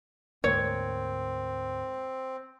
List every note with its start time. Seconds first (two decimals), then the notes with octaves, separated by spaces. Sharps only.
0.44 D2 G#2 A#3 C4 C#5